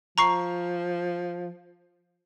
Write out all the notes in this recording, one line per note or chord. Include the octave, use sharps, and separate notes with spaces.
F3 A#5 C#6 C7